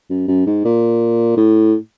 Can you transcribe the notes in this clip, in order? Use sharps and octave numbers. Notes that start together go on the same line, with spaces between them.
F#2
F#2
G#2
A#2
A2